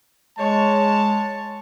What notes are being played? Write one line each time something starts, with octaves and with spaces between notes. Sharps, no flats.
G#3 C#5 A5